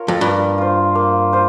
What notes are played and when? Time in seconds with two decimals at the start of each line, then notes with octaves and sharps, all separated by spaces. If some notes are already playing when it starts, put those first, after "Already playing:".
Already playing: F4 A#4 C#5
0.08 F2
0.21 G2 A#3
0.58 F4 C5
0.95 A#3
1.33 F4 C5